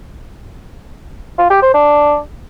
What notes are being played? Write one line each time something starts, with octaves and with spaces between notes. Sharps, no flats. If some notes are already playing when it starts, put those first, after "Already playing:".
F4
G4
C5
D4